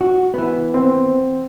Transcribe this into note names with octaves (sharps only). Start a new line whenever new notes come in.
F#4
E3 B3
C4